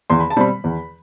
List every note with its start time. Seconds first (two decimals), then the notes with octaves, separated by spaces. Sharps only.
0.10 E2 C6
0.20 B5
0.30 A5
0.37 B2 G3 C4 B5
0.64 E2